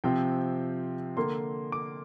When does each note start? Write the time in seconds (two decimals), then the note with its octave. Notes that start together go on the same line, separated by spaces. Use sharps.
0.04 C3 F3 C4 G5
1.17 D3 A#3 C6
1.72 D6